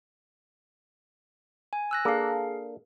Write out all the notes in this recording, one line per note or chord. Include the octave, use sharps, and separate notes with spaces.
G#5
E6 F#6 A#6
A#3 D4 G#4 A4 F5